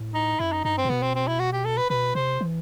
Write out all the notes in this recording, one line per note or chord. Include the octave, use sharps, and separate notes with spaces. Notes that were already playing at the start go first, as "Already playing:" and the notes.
Already playing: A2
D#4
F#2 E4
D#4
G2 D#4
C4
A2
B2 B3
C4
C4
E4
F#4
G4
A4
B4
B2 B4
C3 C5
E3